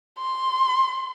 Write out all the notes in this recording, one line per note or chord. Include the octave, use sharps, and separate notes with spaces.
C6